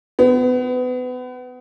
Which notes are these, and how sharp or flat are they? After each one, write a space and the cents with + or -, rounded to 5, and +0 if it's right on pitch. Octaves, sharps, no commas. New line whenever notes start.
B3 +30